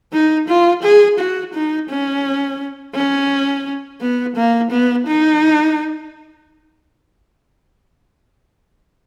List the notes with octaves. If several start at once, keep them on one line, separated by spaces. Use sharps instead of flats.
D#4
F4
G#4
F#4
D#4
C#4
C#4
B3
A#3
B3
D#4